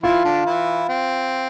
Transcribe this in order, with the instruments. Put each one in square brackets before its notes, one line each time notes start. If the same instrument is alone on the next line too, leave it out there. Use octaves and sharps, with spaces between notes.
[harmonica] E3 E4 [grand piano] F4
[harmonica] D3 D4
E3 E4
C4